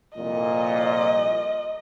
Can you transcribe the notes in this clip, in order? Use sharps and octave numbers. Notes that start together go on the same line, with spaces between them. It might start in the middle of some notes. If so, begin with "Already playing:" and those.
C2 F2 A#2 D#5